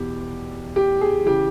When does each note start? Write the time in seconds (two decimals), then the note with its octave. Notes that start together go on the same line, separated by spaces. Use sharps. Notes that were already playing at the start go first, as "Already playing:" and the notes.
Already playing: E2 B2 G4
0.76 G4
1.01 G#4
1.26 C#3 E3 G4